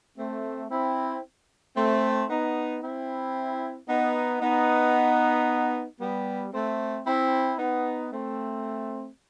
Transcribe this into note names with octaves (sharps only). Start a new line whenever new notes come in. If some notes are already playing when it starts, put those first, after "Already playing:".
A3 C4
C4 E4
A3 C4
B3 D#4
C4 E4
B3 D#4
B3 D#4
G3 B3
A3 C4
C4 E4
B3 D#4
A3 C4